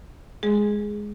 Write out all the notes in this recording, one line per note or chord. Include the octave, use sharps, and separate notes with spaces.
G#3 G#4